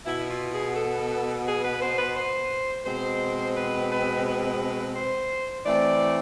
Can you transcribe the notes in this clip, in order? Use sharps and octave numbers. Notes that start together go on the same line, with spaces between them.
B2 B3 E4
F4
G#4
A4
G#4
B4
C5
B4
C5
B2 G#3 C4 C5
B4
B4
B4
C5
E3 A3 C4 D5